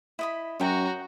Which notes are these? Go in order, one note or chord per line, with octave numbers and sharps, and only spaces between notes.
E4 D#5 B5
F#2 F#4 C#5 G5 A#5